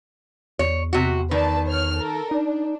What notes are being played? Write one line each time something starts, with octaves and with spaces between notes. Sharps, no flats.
E2 C#5
C3 F#4
D#3 B4 D5 A5
C#5 F6
A4 A#4
D4 D#4